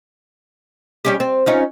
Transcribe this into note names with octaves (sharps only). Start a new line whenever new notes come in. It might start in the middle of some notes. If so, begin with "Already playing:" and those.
G3 C#4 G4
C4
C#4 D#4 F4